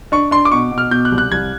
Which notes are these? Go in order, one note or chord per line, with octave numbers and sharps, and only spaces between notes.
D4 C#6
D4 C6
D6
B2 C#6
B2
F6
B2 G6
F#6
C2
F#6
C2 G#6